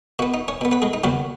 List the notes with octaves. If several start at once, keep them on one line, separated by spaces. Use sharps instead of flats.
B2 B3 F#4
D#4
C#4 C#5
B2 B3
B3 B4
G#3 G#4
D#4
D#2 C#3 F#3 B3 F#4